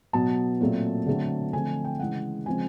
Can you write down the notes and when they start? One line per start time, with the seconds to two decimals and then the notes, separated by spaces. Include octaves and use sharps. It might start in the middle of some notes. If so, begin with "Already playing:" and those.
0.13 B2 F#3 B3 A5
0.61 A#2 F#3 A3 C4
1.06 D3 F#3 A3 C4
1.53 D3 F3 A3 C4 G#5
1.85 G5
2.00 C#3 E3 G#3 F#5
2.46 C#3 F3 G#3 C4 G#5